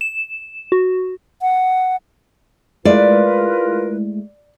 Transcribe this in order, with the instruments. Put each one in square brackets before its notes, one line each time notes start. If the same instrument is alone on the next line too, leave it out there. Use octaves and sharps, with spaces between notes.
[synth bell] E7
F#4
[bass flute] F#5
[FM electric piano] G#3 A3 E4 [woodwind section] F4 A#4 B4 [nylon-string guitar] D5